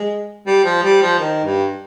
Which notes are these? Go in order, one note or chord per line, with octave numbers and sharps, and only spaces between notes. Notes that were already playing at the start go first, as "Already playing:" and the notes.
Already playing: G#3
G3
F3
G3
F3
D#3
G2